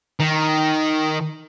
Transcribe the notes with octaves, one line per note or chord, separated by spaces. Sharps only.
D#3